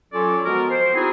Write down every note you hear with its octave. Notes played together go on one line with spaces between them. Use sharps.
F#3 C#4 F4 A4 C#5 D5
F3 G#3 B3 F#4 A#4
C5
C4 D#4 E4 F#4 G#4